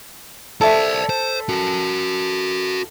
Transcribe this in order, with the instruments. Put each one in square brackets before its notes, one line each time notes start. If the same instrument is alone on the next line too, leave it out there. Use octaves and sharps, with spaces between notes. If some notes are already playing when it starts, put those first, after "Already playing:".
[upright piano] A4 E5 [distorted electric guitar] C5 D5
[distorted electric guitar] C5
F#4 A#4